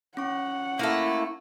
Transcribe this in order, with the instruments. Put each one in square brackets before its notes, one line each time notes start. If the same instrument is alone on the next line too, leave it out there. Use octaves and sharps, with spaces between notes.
[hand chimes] C#4 C#6 [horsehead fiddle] F#5
[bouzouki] A3 A#3 [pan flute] E4